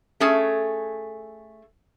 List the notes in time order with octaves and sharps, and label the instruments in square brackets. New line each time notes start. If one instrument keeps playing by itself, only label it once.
[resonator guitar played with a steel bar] A3 C#4 G#4 A4